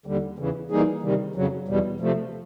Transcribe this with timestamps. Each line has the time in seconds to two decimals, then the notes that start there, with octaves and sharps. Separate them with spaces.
0.06 D#2 D3 G3
0.39 E2 C#3 E3
0.70 E3 G3 A#3 D#4 G#4
1.02 C3 D#3 G3
1.35 F2 C#3 F#3
1.68 E2 B2 G3
2.00 C3 F3 A3